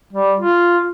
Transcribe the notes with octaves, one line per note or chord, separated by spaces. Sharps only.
G3
F4